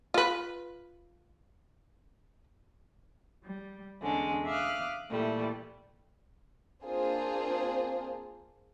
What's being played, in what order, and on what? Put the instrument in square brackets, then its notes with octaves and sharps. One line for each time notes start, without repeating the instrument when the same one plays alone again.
[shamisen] F4 B4
[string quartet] G3
E2 D3 G#3 C#4
E5 F5 D6 D#6 F6 F#6
A#2 E3 G3 A3
[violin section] A#3 C4 D4 F4 G#4 C5